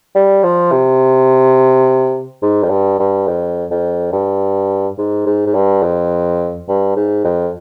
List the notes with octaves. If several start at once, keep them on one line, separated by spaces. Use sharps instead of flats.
G3
F3
C3
G#2
F2
G2
G2
F2
F2
G2
G#2
G#2
G#2
G2
F2
G2
G#2
F2